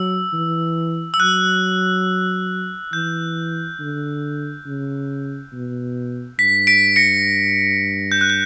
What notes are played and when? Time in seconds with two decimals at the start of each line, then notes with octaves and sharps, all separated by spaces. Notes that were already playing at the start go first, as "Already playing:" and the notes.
Already playing: F#3 E6
0.33 E3
1.14 E6
1.20 F#3 F#6
2.93 E3 G6
3.79 D3
4.66 C#3
5.53 B2
6.39 G2 B6
6.67 B6 D7
6.96 A#6 C#7
8.12 G6
8.21 F#6
8.30 G6